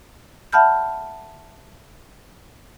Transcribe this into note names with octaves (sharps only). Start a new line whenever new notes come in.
E5 F#5 A5 B5 F6 G6